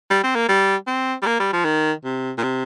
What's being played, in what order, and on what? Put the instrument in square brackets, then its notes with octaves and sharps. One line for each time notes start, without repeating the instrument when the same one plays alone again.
[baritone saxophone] G3
C4
A#3
G3
C4
G3
A#3
G3
F3
D#3
C3
A#2
C3